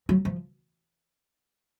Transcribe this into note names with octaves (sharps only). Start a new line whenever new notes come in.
F#3
F3